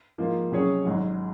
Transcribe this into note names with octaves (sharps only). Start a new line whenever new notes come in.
G#2 F3 A#3 F4
C3 F#3 C#4 G#4 C#5
G#1 G#2 F#3